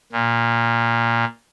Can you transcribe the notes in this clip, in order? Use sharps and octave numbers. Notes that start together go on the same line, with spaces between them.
A#2